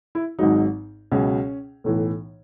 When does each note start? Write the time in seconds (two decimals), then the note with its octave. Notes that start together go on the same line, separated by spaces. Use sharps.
0.15 E4
0.39 G#1 G#2 F#3 D#4
1.12 C#2 B2 F#3 C#4
1.84 B1 A2 E3